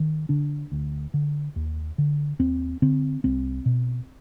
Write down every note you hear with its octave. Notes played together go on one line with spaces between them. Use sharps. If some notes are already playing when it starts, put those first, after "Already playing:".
Already playing: D#3
D3 D4
D2
D3
D#2
D3
D#2 C4
D3 C4
C2 C4
B2